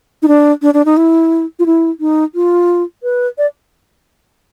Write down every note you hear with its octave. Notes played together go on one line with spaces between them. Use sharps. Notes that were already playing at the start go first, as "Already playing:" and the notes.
D#4
D4
D4
D4
D#4
E4
F4
E4
D#4
F4
B4
D5